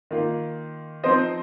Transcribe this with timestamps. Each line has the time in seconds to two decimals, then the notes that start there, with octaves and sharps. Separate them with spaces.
0.11 D#3 A#3 F4
1.03 F3 C4 D#4 C5 D#5